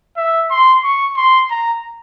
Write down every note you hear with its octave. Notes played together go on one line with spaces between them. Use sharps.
E5
C6
C#6
C6
A#5